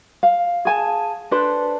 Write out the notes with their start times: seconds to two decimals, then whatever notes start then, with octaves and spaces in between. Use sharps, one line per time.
0.23 F5
0.65 G#4 G#5 A5
1.31 D4 A4 B4 C5